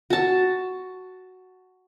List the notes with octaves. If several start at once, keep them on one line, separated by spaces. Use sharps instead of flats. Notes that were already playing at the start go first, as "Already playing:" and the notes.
F#4 A5